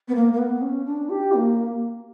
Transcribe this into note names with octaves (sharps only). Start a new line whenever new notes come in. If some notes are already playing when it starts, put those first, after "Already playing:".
B3
A#3
A#3
B3
C#4
D4
G4
A#3